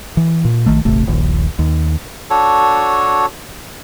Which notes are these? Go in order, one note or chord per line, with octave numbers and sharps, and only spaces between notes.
E3
A#2
A#1 D#3 A3
D#1 G#1 C3 A3
D#1 A#1 D#2
D#2
D4 F#4 A4 C#5